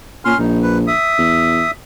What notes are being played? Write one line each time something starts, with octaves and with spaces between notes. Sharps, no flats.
A#2 C#4 C6 F6
A#1 D#4
B4
E5 D#6
E2